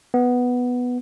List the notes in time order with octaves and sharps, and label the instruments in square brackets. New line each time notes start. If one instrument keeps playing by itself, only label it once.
[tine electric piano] B3